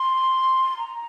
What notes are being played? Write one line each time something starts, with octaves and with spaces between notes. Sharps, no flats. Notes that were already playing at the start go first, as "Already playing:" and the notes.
Already playing: C6
A#5